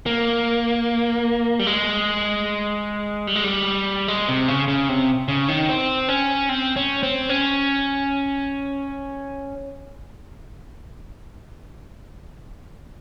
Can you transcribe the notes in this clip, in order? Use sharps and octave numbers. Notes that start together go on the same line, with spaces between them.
A#3
G3
G#3
G3
G#3
G3
G#3
C3
C#3
C#3
C3
C#3
D#3
C4
C#4
C4
C#4
C4
C#4